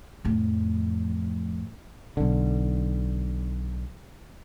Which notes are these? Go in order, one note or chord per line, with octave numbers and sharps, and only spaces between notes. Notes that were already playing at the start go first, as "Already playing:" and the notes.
F2 A2
B1 D3